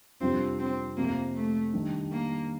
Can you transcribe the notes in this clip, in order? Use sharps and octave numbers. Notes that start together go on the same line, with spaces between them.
F2 C3 G3 C4 D4 F4
C4
F2 C3 F3 A#3
A3
D#3 G3 D4 G4
A#3